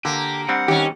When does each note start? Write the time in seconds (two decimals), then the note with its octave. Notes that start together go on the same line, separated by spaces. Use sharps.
0.05 D3 A#3 G4
0.49 G3 C4 D4 F#5
0.68 D#3 C#4 G4